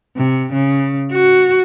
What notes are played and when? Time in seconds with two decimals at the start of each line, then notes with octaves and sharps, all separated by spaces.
0.17 C3
0.53 C#3
1.12 F#4